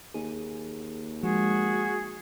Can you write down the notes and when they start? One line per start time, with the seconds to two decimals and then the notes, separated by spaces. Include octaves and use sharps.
0.14 D#2 G#4
1.23 F3 G#3 F#4 G#4